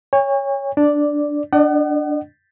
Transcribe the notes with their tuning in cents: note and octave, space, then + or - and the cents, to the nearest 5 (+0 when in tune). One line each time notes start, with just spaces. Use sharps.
C#5 +0 G#5 -45
D4 +0 D5 +0
D4 +0 D#5 -45 F#5 +35